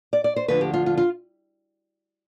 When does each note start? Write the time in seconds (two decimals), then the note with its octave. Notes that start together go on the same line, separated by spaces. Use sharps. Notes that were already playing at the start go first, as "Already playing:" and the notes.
0.13 D5
0.24 D5
0.36 C5
0.48 D2 D3 F3 B4
0.61 G4
0.73 F4
0.86 F4
0.97 F4